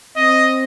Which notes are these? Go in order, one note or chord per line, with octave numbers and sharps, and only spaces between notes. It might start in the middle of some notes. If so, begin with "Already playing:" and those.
C4 D#5